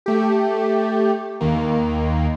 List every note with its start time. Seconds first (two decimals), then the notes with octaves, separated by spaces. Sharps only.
0.06 A3 G4
1.41 D#2 D#3 A#3